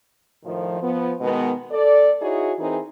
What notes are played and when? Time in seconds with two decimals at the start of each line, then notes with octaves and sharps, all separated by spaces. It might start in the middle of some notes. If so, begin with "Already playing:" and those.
0.44 A2 D#3 F3
0.81 F3 B3
1.21 B2 D#3 G#3 B3
1.71 A4 D5
2.21 D#4 E4 F#4 G#4 C#5
2.59 E3 C4 D#4 G#4 A#4